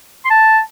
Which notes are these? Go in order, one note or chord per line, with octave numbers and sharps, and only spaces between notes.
C6
A5